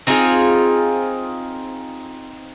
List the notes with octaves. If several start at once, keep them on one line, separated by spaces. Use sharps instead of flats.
C4 D#4 F4 G#4